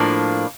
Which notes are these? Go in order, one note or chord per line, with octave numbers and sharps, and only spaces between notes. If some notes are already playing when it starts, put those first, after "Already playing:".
Already playing: A2 F3 A#3 D4